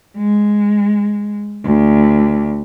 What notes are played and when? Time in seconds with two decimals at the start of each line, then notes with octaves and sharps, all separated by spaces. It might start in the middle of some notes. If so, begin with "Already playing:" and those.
0.17 G#3
1.64 D2